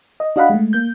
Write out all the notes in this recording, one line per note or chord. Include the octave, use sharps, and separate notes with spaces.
D#5
D4 F#4 D#5 F5 F#5 B5
G#3 A3
A#3 G6